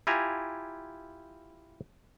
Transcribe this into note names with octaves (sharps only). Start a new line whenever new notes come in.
E4 F4 G4 G#5 A#5